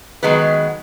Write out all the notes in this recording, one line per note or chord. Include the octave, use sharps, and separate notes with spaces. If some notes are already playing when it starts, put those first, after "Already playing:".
D#3 F#3 G#3 B3 B4